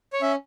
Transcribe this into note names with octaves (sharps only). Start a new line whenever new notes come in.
C#5
C#4 E5